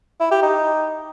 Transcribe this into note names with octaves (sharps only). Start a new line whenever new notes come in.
E4
G4
D#4